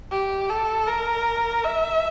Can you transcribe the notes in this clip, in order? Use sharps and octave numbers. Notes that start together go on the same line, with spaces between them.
G4
A4
A#4
E5